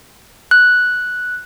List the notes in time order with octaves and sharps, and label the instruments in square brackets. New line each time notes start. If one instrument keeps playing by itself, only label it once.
[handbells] F#6